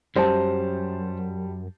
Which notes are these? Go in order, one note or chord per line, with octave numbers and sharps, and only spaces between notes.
F#2 G3 C5 A5